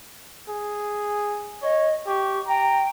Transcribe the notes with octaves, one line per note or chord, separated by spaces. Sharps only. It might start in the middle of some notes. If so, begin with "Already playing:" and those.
G#4
C#5 D#5
G4 C#6
G5 A#5